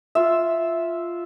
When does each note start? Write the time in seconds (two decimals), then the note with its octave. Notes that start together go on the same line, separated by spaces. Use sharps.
0.15 F4 E5